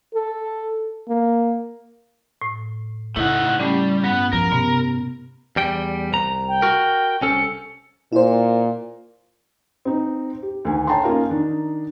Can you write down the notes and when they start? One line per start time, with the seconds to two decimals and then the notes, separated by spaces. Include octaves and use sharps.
0.14 A4
1.08 A#3
2.41 A2
3.16 C#3 A3 D#4 E4 F#5
3.60 G3 A3 C#4
4.04 G2 B3
4.33 F3 A#4
4.52 C3 B3
5.56 E2 G3 G5
6.12 C2 A#5
6.48 G5
6.62 F#4 A#4
7.21 C2 C#4 A4 C#7
8.12 A#2 E4 C5
9.85 C4 D#4
10.42 G4
10.65 D2 D#3 G#5
10.87 C#5 G5 A5 A#5 C6
11.04 A#3 C#4 D#4 F4 A#4 F5
11.30 D#3 D4 D#4